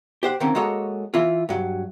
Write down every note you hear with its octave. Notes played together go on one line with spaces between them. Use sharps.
G4 C5 F#5
D3 D#3 A#3 C4 C#4
G#3 A#3 F#4 A4 C#5 D#5
E3 E4 F4
G2 F#3